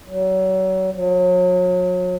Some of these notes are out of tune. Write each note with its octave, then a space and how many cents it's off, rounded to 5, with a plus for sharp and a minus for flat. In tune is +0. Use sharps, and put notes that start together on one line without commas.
F#3 +30
F#3 -35